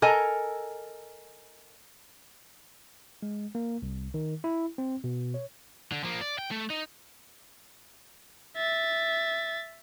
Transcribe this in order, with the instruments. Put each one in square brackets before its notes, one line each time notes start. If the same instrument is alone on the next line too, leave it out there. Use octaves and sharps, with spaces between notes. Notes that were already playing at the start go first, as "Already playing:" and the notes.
[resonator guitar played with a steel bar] A4 A#4 D#5 G#5 A#5
[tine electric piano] G#3
A#3
C2
D#3
E4
C4
B2
C#5
[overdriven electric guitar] D3
F3 A#3
D5
G5
A3
D#4
[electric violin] E5 A6